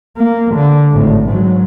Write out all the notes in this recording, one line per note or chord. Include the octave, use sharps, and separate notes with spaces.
A#3
D3
G#1 A2
G#2 F#3